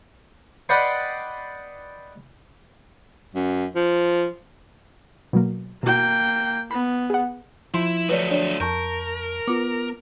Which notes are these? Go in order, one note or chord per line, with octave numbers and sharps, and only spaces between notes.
B4 D5 D#5 F#5 G5 C6
F#2
F3
B2 F#3 A#3
B2 A#3 F#4 G5
B3 B5
G#4 F#5
F3 E4 C6 E7
F#3 A3 B4 C#5 D5
D4 C#5 D5
F2 A#4 A5 C#6 G6
B3 F4 D6